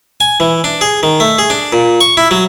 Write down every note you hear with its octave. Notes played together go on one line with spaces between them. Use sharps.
G#5
E3
D4
G#4
D#3
A3
G#4
D4
A#2
C#6
E4
F#3